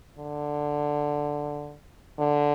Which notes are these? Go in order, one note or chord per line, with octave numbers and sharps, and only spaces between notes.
D3
D3